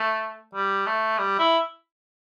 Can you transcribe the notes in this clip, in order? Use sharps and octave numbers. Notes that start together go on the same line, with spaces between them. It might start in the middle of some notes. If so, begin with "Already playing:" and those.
Already playing: A3
G3
A3
G3
E4